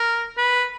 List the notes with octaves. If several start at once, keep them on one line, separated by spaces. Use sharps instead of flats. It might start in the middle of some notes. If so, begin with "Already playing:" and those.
Already playing: A#4
B4